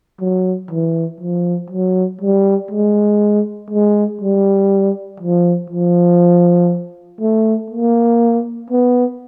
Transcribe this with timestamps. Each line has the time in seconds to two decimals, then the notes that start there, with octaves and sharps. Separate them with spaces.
0.21 F#3
0.71 E3
1.21 F3
1.70 F#3
2.21 G3
2.71 G#3
3.70 G#3
4.21 G3
5.20 F3
5.70 F3
7.21 A3
7.70 A#3
8.70 B3